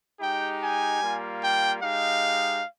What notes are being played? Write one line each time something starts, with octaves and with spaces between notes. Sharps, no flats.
G#3 D#4 G4 G5
G#5
G3 A#3 F4
G5
G#3 D#4 G4 F5